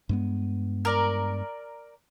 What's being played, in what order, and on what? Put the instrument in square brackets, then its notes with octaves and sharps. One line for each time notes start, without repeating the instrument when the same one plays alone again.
[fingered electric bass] G2 G#3 B3
[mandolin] A#4 D5